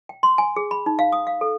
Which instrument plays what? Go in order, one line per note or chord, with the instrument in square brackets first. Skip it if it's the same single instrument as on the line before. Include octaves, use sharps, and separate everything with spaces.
[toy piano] G5
C6
G#5
G#4
B5
D#4
F5
D#6
F5
A4